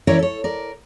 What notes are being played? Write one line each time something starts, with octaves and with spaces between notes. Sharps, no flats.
E3 C#4 E4 A#4 C#5 D5
A4 C#5
A#4 D5